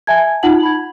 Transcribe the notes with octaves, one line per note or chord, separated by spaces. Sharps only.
E5 G#5 A5 G#6
D#4 F4 F#5 A5 F#7
B5 G#6